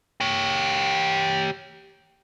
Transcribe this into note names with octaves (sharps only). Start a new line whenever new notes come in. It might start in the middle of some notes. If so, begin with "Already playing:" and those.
G4 C#5